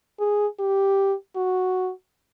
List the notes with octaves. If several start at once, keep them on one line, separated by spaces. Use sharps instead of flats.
G#4
G4
F#4